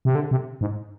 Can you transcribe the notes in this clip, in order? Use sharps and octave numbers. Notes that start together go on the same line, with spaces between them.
C3
D3
C3
G#2